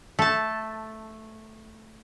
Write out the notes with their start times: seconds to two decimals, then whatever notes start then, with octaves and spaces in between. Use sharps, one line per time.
0.19 A3 A5